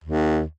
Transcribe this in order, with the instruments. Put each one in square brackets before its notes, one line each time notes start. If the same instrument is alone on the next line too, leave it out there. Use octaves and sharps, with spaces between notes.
[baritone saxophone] D#2